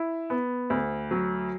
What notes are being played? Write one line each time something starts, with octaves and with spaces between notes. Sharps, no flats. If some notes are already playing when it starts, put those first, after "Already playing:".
Already playing: E4
B3
D2
F#3